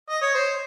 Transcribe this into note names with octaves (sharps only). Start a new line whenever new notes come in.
D#5
C#5
C5